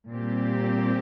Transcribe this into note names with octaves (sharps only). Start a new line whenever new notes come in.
A#2 G3 C4 G4